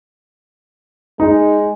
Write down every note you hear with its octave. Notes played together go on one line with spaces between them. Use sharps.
G#3 D#4